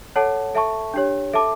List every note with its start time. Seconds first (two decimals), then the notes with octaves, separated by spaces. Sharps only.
0.16 A4 C#5 F#5 A5
0.55 A4 E5 A5 C#6
0.94 D4 G4 C#5
1.33 A4 E5 A5 D6